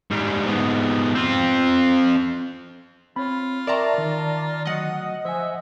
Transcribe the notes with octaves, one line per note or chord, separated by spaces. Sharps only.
G#2 G3
G#2 B3
C4 F4
C4 F4 C#5 B5
A#4 D5 E5 G5 A5 A#5 C6 C#6
D#3
D2 F#3 D#5 F#5 D#6
F3 C5 E5 G#5